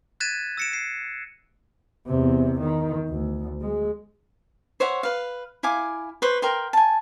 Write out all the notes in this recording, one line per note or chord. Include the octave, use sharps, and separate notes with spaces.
F#6 G#6 A6 B6 D#7 E7
E6 A#6 C#7 D7 E7
C7
E2 C3
D#3
D2
G#3
C5 C#5 E5 F#5
B4 F5
E4 F5 G#5 D6
B4 C5 C#6
A#4 G5 C6
G#5 A5